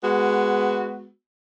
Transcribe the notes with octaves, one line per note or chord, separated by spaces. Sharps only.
G#3 B3 F#4